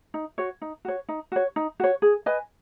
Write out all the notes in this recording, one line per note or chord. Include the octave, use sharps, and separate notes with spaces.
D#4
F#4 C#5
D#4
F#4 C#5
D#4
F#4 C#5
D#4
F#4 C#5
G#4
B4 D#5 G#5